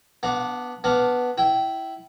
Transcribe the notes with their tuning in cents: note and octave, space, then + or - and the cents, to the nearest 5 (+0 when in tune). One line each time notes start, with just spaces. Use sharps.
B3 +0 D4 +0 F5 +45
B3 +0 D4 +0 F5 +0
E4 +0 G5 -25